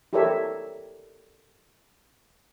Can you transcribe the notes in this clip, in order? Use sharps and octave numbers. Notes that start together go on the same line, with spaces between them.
E4 G4 A4 A#4 C#5 E5